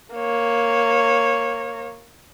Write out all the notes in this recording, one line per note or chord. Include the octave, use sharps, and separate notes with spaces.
A#3 C#5